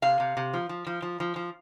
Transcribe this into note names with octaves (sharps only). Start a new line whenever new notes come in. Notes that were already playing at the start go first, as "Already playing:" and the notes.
C3 F5
C3
C3
F3
F3
F3
F3
F3
F3